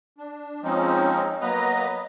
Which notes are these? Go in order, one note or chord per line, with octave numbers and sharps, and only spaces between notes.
D4
F3 G#3 C4 C#4 D#4
F#3 A#3 B3 B4 D#5 A#5